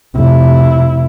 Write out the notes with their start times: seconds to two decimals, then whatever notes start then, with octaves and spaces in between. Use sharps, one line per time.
0.15 F1 E4